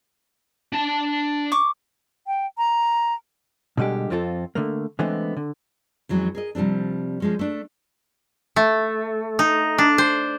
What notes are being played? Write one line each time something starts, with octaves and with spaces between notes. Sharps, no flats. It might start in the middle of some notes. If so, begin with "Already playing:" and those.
D4 A5
C#6 D6
G5
A#5
B2 D3 G3 G#3 G4
F2 C4 F4 G4 A4
D3 A3 A#3
D3 E3 G#3 A3 B3 C4
D3
F2 E3 F#3 G#3 C#4
G#4 A#4 D#5
C3 F3 G3 C4 D4
F3 G#3 C#4
A3 D4
A3
D#4
D4
C5